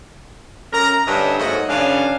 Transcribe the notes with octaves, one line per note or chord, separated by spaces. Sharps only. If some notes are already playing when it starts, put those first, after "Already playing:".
F#2 A#4 A#5
G2 D3 C#4 D4 D#5 E5
G#2 F#3 A3 A#3 F#4 D#5
F#2 C#3 C#4 D4 B4 F5